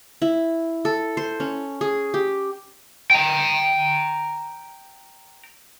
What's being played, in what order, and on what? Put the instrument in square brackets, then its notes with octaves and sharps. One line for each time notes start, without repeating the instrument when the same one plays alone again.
[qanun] E4
A4
C5
C#4
G#4
G4
[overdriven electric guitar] G5 A#5